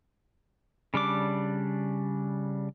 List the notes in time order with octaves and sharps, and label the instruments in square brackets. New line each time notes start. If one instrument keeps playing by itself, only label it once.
[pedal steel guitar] C#3 G3 D4 D6